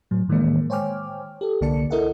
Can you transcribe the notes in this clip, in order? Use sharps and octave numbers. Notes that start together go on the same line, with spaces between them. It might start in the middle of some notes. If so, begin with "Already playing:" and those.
A2 F#3
A2 D#3 E3 G#3 A#3
C5 C#5 G5 G#5 D6 F6
G4 A4
C2 D3 A#3 D5 A5 C#7
E4 A4 A#4 D#5 E5 F#5